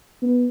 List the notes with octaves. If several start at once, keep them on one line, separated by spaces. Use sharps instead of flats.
B3